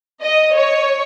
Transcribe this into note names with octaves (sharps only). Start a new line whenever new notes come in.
D#5
C#5